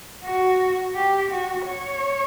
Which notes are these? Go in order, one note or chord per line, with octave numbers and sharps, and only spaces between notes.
F#4
G4
F#4
C#5